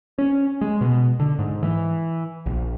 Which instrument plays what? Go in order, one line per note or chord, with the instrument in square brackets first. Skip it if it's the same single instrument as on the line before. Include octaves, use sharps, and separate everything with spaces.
[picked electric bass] C#4
G#3
B2
D3
G#2
E3
A#1